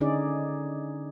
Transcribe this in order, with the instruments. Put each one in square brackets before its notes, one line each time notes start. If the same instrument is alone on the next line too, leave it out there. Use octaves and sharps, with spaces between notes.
[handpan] D3 C#4 D#4 G#4 D5